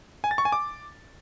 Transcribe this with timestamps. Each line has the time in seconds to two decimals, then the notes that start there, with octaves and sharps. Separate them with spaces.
0.24 G#5
0.31 A6
0.38 C#6
0.45 G#5
0.52 D6